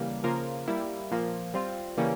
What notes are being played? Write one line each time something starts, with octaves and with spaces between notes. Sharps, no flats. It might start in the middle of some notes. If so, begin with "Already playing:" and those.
Already playing: C#3 E3 G3 A#3
C#3 F3 A#3 F4 A#4
G3 A#3 E4
A#2 F3 A#3
G3 C4 F4
C#3 E3 G3 A#3 C#4